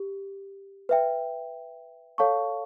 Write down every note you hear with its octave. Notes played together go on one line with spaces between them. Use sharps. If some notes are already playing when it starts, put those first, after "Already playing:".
Already playing: G4
B4 E5 G5
A4 C#5 F5 A5 C#6